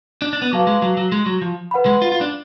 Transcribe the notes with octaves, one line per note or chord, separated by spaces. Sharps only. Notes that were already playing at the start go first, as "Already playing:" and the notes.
D4
D4
B3
F#3 B4 F5 A5 D6
G#3
F#3
F#3
G#3
F#3
F3
B4 F#5 B5
G#3
F4
F4
D4